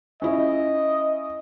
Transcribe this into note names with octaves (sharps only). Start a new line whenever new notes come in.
C#4 E4 D#5